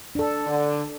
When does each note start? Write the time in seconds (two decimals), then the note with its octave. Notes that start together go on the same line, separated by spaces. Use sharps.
0.15 D4 A4
0.47 D3